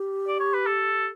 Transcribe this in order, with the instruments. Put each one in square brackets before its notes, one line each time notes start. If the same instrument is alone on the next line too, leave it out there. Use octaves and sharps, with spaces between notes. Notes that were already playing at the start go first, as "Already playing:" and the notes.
Already playing: [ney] G4
[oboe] D5
C#5
B4
A4